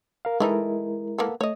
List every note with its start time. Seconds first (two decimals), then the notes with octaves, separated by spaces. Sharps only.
0.25 A#4 F5
0.40 E3 G#3 A3 D#4 E4 A#4
1.18 A#3 B3 A4
1.41 A3 C#5 D#5